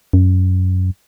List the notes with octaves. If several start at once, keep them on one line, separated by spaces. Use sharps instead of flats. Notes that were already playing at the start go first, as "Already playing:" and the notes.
F#2